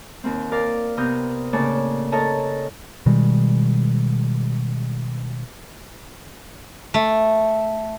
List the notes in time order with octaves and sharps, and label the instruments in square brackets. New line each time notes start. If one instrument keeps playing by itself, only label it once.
[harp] D#2 A#3 C4
A#4 D5 F5
C3 B3 A#4 D#6 F6 G6
A2 C#3 A#3 C#5 D5 A5
A4 A#4 C#5 D#5 A5 A#5
[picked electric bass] B2 D#3 G3 G#3
[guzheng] A3